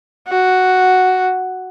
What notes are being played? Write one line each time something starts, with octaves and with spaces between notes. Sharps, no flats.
F#4